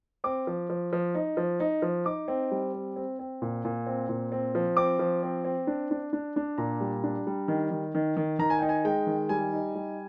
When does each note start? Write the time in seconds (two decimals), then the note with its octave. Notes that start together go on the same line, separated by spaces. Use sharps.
0.24 C4 D6
0.47 F3
0.70 F3
0.93 F3
1.15 D#4
1.37 F3
1.60 D#4
1.82 F3
2.05 D#4 D6
2.28 C4
2.51 G3
2.74 C4
2.96 C4
3.19 C4
3.42 A#2
3.65 A#2
3.87 C4
4.09 A#2
4.32 C4
4.55 F3
4.77 C4 D6
4.99 F3
5.23 C4
5.45 C4
5.67 D4
5.91 D4
6.13 D4
6.36 D4
6.58 A#2 A#5
6.81 G3
7.04 D4
7.27 G3
7.48 D#3
7.71 D#3
7.95 D#3
8.17 D#3
8.39 D#3 A#5
8.50 G#5
8.59 D#4 G5
8.69 G#5
8.85 G#3 G5
9.07 D#3
9.29 G3 G#5
9.53 D#4
9.75 G3